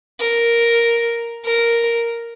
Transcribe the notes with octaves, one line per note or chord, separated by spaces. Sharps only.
A#4
A#4